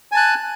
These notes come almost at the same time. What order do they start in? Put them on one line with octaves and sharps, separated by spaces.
G#5 A5 F#6